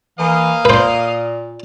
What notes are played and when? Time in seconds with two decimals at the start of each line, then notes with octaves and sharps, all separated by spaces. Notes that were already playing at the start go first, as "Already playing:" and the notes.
0.19 E3 A#3 D#5 F5
0.65 A#2 B4 C5